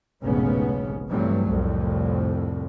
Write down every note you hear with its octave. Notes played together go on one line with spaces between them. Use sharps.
F1 B1 G#2 C#3 B3 C#4
G2 C3 E3 F#3 G3 A3
C2 F2 A2